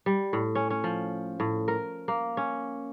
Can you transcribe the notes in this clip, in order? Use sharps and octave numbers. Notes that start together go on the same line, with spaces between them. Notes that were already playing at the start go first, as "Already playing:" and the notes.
G3
A2
C#4
C#4
F3
A2
A#4
A#3
C#4